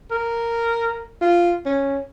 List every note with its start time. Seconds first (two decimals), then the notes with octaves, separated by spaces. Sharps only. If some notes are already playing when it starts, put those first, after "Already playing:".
0.11 A#4
1.21 F4
1.66 C#4